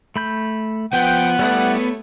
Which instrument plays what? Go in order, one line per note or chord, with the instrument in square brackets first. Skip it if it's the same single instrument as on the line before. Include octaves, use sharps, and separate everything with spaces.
[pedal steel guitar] A3 B5 G6
[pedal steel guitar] F3 [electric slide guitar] B3 [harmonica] F#5 [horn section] G5
[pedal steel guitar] G3 E4 D5 [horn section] A3 C#5